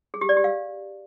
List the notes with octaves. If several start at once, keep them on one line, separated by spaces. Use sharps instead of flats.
G#4
G4
D5
G4
F5